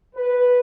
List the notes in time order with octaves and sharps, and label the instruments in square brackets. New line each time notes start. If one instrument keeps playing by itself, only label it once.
[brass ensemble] B4